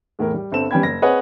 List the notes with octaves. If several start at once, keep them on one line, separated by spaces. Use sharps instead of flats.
E2 A2 E4 A#4
G3
G1 C4 A4 E7
G3 B3 C#4 G5 B5 G#6
F#1 A#6
C4 G#4 B4 C#5 D#5 F#5